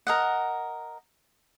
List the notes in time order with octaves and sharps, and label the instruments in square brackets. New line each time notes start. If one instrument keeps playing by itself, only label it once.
[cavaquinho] A#4 D#5 F#5